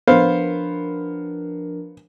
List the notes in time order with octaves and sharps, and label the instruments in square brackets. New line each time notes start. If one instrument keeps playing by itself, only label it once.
[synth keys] F3 D4 A#4 [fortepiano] B3 C5 F5